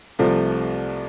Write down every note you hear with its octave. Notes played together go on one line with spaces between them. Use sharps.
C2 C3 F3 A3